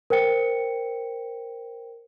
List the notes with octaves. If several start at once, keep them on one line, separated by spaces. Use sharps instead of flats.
A#4 C5 G5 C#7